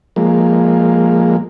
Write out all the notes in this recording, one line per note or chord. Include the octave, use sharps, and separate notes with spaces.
F3 G#3 A#3